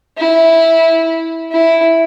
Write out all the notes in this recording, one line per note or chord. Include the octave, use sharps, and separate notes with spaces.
E4
E4